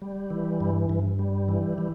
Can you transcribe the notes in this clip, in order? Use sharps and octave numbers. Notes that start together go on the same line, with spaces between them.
G3
E3
G2
G2
G3
E3
E3